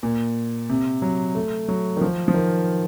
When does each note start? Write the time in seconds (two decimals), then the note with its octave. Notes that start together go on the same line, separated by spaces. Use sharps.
0.03 A#2
0.69 C3
1.02 F#3
1.35 A3
1.68 F#3
1.97 D#3
2.01 F3
2.28 F3
2.34 D#3